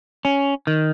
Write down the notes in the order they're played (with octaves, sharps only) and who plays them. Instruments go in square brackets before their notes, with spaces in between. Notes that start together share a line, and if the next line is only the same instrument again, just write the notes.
[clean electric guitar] C#4
D#3